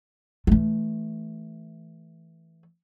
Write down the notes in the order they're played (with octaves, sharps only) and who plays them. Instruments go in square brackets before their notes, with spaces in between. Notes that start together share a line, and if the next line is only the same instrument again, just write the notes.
[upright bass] E3 A3